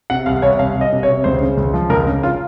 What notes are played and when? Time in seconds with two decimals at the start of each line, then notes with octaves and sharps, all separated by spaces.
0.10 C3 F#5
0.26 C2 F5
0.42 C2 C#5
0.59 C2 F5
0.75 C2
0.81 D#5
0.92 C3
1.03 C#5
1.08 C3
1.24 C#2 C5
1.41 C#3
1.57 C#2
1.74 F3
1.89 C#2 A#4
2.07 C#3
2.23 F4